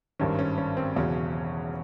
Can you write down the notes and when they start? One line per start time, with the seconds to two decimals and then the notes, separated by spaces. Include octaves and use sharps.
0.19 G#1 G2 D#3 C#4
0.39 C#4
0.58 C#4
0.77 C4
0.95 E1 E2 C#3 F#3 C#4